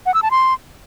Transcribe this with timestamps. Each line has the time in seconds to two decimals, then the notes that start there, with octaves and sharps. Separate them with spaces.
0.06 F#5
0.14 E6
0.23 A5
0.31 C6